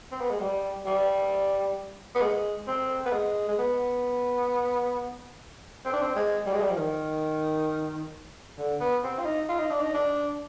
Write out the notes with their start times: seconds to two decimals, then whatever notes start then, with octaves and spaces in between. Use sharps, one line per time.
0.12 C4
0.21 B3
0.30 G#3
0.40 G3
0.86 G3
2.15 B3
2.22 G#3
2.67 C4
3.06 B3
3.12 G#3
3.48 G#3
3.58 B3
5.85 C4
5.93 D4
6.02 C4
6.15 G#3
6.46 G3
6.53 G#3
6.61 G3
6.70 F3
6.77 D#3
8.58 D3
8.81 B3
9.04 C4
9.19 F4
9.25 D#4
9.49 F4
9.59 D#4
9.70 D4
9.81 D#4
9.94 D4